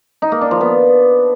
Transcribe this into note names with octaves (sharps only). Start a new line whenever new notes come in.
D#4
A#3
D4
F3
B3